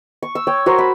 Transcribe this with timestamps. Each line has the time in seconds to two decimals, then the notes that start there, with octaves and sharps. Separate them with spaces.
0.23 C#6
0.35 E6
0.47 C#5 G5
0.66 F#4 A#4 C5
0.79 B5